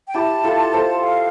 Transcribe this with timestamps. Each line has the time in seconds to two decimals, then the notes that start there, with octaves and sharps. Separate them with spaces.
0.08 G5
0.14 E4 G4 A5
0.44 F4 A4
0.73 A4 C5
1.03 F5